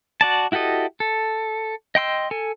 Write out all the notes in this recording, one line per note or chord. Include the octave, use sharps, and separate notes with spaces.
F#4 D5 A5
E4 F#4 G4 A4 D#5
A4
D#5 G5 C6 E6
A4 G#5